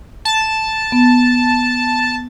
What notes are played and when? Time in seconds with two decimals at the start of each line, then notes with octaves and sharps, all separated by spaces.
0.25 A5
0.92 B3